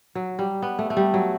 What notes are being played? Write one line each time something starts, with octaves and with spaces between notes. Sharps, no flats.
F#3
G3
B3
A3
A3
G3
F#3